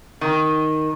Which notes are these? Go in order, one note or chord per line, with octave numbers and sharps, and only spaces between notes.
D#3